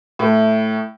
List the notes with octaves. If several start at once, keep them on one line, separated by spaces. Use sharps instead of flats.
A2